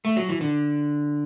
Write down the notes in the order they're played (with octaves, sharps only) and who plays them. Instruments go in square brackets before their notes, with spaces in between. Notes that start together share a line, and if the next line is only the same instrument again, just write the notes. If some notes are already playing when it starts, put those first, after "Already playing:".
[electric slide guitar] A3
F#3
E3
D3